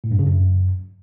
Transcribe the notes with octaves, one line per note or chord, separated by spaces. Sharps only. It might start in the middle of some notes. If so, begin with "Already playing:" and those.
A2
G2
C#3
F#2